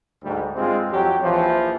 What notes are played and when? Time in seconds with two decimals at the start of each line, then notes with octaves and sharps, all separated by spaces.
0.23 D2 G#2 G3
0.55 G2 G#3 C4 F4
0.90 F2 F#3 G4
1.23 A#1 E3 F3